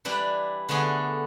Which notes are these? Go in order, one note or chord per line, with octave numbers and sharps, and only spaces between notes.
E3 G3 D4 E4
D3 A3 B3 D4 G#4